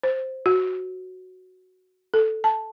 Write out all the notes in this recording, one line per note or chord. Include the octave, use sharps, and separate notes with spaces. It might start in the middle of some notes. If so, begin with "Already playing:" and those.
C5
F#4
A4
A5